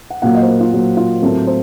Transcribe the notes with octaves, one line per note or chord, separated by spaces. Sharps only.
F#5
A#2 F#3 A#3 F#5
D#5
C5
A#4
F4
A#2 F#3 A#3
F4
A2 F#3 A3 C4 A#4
C5